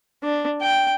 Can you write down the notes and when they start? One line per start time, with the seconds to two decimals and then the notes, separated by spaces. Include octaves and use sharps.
0.23 D4
0.62 G5